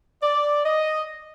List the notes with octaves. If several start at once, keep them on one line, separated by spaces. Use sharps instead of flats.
D5
D#5